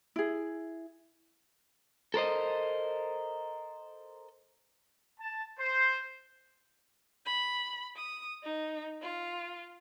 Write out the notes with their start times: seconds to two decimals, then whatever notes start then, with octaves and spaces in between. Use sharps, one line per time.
0.16 E4 G#4
2.14 A4 A#4 C5 D#5
5.20 A5
5.59 C5
7.26 B5
7.96 D#6
8.44 D#4
9.02 F4